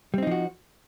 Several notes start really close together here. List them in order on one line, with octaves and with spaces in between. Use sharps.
G3 C4 D#4 F3 F#4